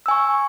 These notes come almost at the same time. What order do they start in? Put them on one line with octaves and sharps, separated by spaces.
E6 G#5 C#6